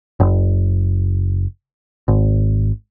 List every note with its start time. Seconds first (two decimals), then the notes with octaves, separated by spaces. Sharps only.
0.20 F#1
2.08 G#1